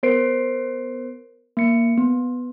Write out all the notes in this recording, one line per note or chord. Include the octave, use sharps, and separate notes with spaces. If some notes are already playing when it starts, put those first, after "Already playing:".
B3 A#4 C5 C7 D7
A#3 C#7
B3